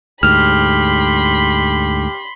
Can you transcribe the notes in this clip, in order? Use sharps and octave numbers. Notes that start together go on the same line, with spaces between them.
D2 G#2 G4 B5 C6 F6